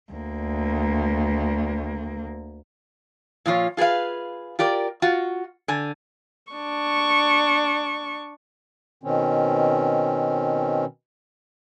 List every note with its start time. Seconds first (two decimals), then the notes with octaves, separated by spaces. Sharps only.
0.13 D2 A#3
3.46 A#2 F3 F4 C#5
3.77 F4 G#4 A#4 B4 F5
4.59 F4 G4 A#4 D5
5.02 F4 F#4
5.68 D3 G#5
6.52 D4 C#6
9.03 B2 D#3 C4 C#4